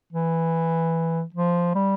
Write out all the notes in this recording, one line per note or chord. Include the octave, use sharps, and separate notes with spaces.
E3
F3
G3